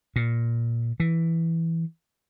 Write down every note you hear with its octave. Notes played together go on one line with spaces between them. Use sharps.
A#2
E3